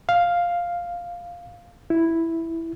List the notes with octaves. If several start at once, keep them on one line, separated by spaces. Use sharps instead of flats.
F5
E4